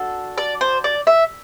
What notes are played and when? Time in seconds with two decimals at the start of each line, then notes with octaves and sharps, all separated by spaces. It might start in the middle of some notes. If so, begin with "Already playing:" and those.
Already playing: D4 F#4 A4
0.38 D5
0.61 C5
0.84 D5
1.07 E5